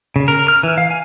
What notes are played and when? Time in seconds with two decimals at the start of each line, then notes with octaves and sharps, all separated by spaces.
0.16 C#3
0.28 A#4
0.48 F6
0.63 E3
0.78 F5
0.90 G#5